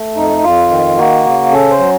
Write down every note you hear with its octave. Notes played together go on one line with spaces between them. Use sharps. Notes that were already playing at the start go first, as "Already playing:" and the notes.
Already playing: A3
F2 D#4
F2 F4
D#3
A#3 F#4
C#3
C#4 A4
C5
F#3